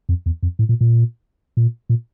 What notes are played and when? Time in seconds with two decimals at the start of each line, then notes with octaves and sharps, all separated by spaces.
0.09 F2
0.26 E2
0.43 F2
0.59 A2
0.69 A#2
0.81 A#2
1.57 A#2
1.89 A#2